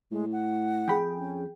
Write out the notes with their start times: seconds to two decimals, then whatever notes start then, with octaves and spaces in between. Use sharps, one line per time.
0.12 A2 G#3
0.32 F#5
0.88 F2 G#4 G5 B5
1.17 C#4